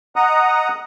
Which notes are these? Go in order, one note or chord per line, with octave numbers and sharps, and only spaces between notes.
D#5 F#5 A#5 D#6